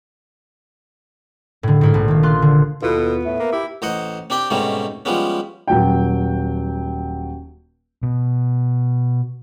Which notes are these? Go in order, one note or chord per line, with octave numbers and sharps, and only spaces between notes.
A2 D3
G#2 E4 F4
A#1
D#3 A#3
F4 C6 F#6
D3
D#2 B2 B3 E4 F4 A4
A2 E5
A#3 A#4
E4 G4 D6
A1 C5 D#5 F#5
C4 D4 G4 G5
G#2 B2 G3 A3 C4 C#4
F3 G3 G#3 B3 C#4
D#1 F#3 G5
B2